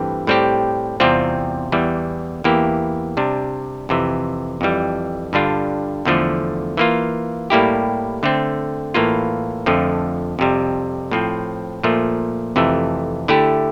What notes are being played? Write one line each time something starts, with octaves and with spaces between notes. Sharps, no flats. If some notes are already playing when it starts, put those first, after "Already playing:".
Already playing: G2 E3 A3 C4 G4
A2 G3 C4 G4
E2 C3 G3 C4 F4
E2 E3 G3
E2 E3 A#3 E4 G4
C3 G3 D4
F2 C3 E3
F2 E3 G3
G2 D3 G3 D4 F4
E2 D3 F3 A3
E3 A#3 F4
A2 G3 A#3 E4 G4
D3 A3 C4
A2 E3 A#3 F4
F2 D3 F3 A3
F2 C3 G3
A2 F3 C4
A#2 F3 A3
F2 C3 E3 A3
D3 A3 E4 G4